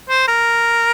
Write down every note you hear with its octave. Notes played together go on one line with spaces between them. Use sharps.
C5
A#4